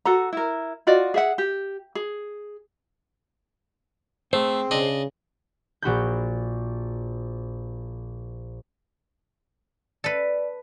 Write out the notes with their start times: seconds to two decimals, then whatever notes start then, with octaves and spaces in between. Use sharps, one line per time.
0.05 F#4 A4 A#5
0.33 E4 A#4
0.87 F4 F#4 D5 D#5
1.14 G#4 E5 F#5
1.38 G4
1.95 G#4
4.33 A3 C4 G#4 C5
4.71 C#3 D4 D#5
5.82 A#1 F#4 B5 G6
10.04 A4 B4 D5